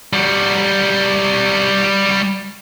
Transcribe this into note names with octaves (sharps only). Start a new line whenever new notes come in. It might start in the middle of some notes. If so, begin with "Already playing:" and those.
G3 F#4